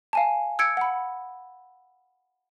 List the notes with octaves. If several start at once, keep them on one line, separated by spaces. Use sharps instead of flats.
F5 G#5 A5
E6 G#6 C#7 D7
F#5 B5